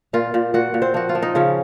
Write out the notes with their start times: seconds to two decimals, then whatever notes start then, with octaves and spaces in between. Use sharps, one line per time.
0.13 A#2 F4 F5
0.34 A#2
0.54 A#2 F#4 F#5
0.74 A#2
0.82 C4 C5
0.94 F3 F#4
1.09 F4
1.15 F3
1.22 D#4
1.35 C#3 F3 C#4